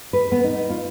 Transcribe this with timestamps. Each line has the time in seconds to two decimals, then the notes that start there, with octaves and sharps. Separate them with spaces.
0.13 B4
0.32 B3
0.44 D#4
0.70 F4